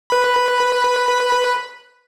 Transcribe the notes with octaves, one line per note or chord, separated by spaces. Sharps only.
B4 B5